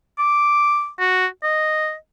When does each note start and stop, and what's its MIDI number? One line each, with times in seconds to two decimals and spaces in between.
0.18 0.89 86
1.00 1.26 66
1.43 1.94 75